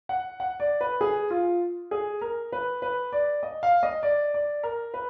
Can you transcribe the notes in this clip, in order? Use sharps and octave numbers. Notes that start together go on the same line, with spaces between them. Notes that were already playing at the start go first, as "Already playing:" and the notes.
F#5
F#5
D5
B4
G#4
F4
G#4
A#4
B4
B4
D5
D#5
F5
D#5
D5
D5
A#4
B4